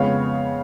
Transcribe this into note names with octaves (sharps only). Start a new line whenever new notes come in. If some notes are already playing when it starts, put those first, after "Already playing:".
Already playing: F2 C#3 G#3 B3 C#5 F5